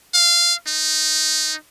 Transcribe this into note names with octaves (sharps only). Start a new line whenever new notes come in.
F5
D#4